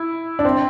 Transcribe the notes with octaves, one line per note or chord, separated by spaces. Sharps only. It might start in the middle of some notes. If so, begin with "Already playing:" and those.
Already playing: E4
D4
C4